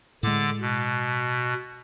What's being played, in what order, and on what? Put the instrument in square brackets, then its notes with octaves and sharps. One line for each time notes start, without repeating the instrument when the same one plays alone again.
[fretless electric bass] A2 G#3 [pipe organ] D3 D6
[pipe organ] B2